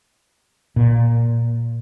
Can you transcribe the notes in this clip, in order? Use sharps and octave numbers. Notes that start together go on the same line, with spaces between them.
A#2